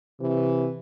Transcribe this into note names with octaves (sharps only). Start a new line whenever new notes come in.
C3 E3